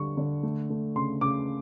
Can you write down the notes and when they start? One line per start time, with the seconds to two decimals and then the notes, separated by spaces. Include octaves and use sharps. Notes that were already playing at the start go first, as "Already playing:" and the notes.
Already playing: D3 G3 C#6
0.17 D3
0.43 A3
0.70 A3
0.96 C#3 C6
1.21 C#3 D6